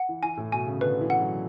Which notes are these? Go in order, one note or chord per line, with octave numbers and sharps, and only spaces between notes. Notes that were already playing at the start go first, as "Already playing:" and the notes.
Already playing: F#5
E3
E3 G#5
A2
B2 G#5
C#3
D3 B4
E3
F#5
F#3